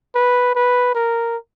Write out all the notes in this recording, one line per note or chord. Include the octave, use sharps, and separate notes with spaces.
B4
B4
A#4